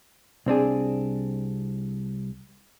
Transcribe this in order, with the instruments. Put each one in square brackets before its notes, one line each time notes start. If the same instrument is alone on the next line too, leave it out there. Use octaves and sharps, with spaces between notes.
[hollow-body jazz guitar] C2 C4 D4 G#4